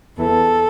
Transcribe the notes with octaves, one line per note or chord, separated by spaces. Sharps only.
E2 E3 A4